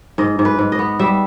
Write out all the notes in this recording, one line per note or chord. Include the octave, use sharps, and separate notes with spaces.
G#2 D#5
G#2
B4
G#2
D#5
B3
G3 E5